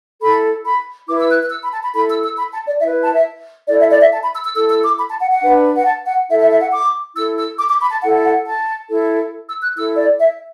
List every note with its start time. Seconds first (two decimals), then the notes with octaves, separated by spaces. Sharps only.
0.21 E4 A4 B5
0.64 B5
1.08 E4 B4 D6
1.18 E6
1.29 F#6
1.41 F#6
1.50 E6
1.62 B5
1.72 A5
1.83 B5
1.94 E4 A4 B5
2.09 E6
2.24 E6
2.38 B5
2.52 A5
2.67 D5
2.81 E4 B4 E5
3.03 A5
3.14 E5
3.68 E4 A4 D5
3.79 E5
3.90 D5
4.01 E5
4.12 A5
4.22 B5
4.33 E6
4.44 E6
4.55 E4 A4 E6
4.69 E6
4.84 D6
4.98 B5
5.09 A5
5.20 F#5
5.31 F#5
5.42 D4 B4
5.75 F#5
5.85 A5
6.06 F#5
6.29 E4 A4 E5
6.39 E5
6.50 E5
6.61 F#5
6.72 D6
7.15 E4 E6
7.18 A4
7.37 E6
7.59 D6
7.69 D6
7.81 B5
7.91 A5
8.02 E4 A4 F#5
8.24 F#5
8.46 A5
8.89 E4 A4
9.47 E6
9.61 F#6
9.75 E4 E6
9.79 A4
9.97 D5
10.19 E5